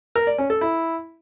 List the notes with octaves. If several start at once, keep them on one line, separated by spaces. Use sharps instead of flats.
A#4
D5
C#4
A4
E4